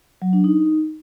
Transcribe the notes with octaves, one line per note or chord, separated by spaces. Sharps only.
F#3
D4
D#4